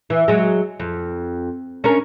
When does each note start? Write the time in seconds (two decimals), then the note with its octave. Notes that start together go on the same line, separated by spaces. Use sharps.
0.10 E3
0.28 F#3 G#3
0.80 F2
1.84 C#4 D4 A#4